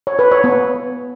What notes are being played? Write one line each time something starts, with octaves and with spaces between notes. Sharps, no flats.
C#5
B4
C#5
B3